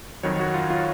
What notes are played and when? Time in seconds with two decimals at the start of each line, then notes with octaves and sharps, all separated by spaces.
0.23 F2 D#3 F#3 C#5
0.39 F#4
0.54 F4
0.70 F4